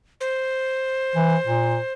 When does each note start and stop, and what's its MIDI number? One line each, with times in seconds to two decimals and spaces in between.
0.21 1.93 72
1.16 1.36 52
1.46 1.78 46